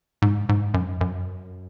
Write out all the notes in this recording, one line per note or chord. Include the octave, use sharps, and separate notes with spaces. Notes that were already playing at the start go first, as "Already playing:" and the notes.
G#2
G#2
F#2
F#2